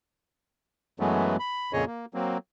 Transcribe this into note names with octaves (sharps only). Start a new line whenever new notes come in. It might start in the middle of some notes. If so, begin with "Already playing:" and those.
F#2 E3 F#3 G#3 A3 B3
B5
F2 A#2 C#3 G#4 C#5 D#5
A#3
F#3 A#3 C4